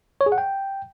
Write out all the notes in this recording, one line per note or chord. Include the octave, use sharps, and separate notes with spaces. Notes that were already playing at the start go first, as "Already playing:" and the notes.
C#5
G#4
F#5
G5